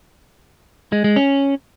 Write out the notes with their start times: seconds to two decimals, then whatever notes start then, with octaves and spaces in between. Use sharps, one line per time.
0.92 G#3
1.04 G#3
1.16 C#4